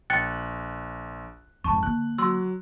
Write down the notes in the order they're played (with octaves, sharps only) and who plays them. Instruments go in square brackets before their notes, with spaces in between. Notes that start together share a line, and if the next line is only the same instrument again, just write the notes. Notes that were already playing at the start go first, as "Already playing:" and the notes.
[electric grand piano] A#1 F#6 [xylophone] G5 A6 C#7
[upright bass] F2 G#2 [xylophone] A5 C#6
[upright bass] D3 A#3 [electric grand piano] F#6
[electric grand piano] F#3 [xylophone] C6 E6